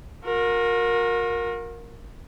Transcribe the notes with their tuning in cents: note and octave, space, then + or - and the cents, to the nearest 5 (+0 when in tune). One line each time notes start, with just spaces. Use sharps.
F#4 -45 A#4 +0